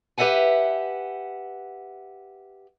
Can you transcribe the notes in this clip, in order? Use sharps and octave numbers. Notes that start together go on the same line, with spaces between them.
G4 B4 D#5 E5 F#5 G#5